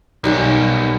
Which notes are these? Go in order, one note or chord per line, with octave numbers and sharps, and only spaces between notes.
B1 D#3 G3 C#4